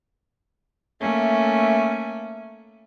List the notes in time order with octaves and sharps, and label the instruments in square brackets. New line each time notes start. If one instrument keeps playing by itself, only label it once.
[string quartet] A3 A#3 C#4 E5